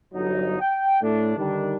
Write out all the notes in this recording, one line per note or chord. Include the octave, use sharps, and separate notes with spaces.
G1 F#3 D#4
G5
A2 A3 D4
D3 D#3 G3 D4